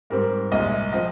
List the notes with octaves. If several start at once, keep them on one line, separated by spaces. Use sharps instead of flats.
G#2 G3 C4 A#4
C2 A#2 G#3 D#5
F3 C4 D#5